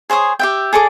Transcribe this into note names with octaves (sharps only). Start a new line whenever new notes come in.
G#4 C5 C#5 D#6
G4 E5 G5
G#4 A4 D5 D6